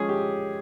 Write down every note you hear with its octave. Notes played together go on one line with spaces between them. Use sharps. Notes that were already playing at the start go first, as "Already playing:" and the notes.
Already playing: F3 G#3 C#4 G#4
G4